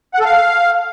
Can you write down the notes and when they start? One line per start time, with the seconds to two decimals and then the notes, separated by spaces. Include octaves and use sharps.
0.14 F#5
0.20 A4
0.25 F5